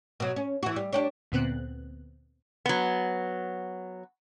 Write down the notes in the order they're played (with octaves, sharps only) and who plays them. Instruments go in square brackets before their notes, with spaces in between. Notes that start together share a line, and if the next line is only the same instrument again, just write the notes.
[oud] B2 F#3
C#4
E3 F#4
G3
D4 G4 C#5
[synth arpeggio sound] D2 A#2 B3 C4 F#6
[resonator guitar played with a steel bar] F#3 B3